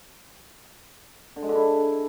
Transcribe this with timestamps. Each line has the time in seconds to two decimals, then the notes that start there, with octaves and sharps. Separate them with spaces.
1.36 D3
1.43 G#3
1.49 D3
1.55 E4